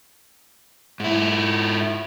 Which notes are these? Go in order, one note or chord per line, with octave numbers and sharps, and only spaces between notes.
G#2 E4